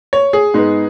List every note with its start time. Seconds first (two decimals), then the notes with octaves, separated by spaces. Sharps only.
0.13 C#5
0.33 G#4
0.54 G#2 G#3 B3 D#4